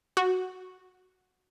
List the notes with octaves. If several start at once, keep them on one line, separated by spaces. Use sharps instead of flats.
F#4